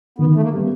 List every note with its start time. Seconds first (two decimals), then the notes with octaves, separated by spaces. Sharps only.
0.18 D#3 B3
0.35 A3
0.42 A#3
0.53 G3 B3